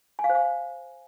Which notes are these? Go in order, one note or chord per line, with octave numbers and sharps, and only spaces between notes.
G#5
F5
C5
F5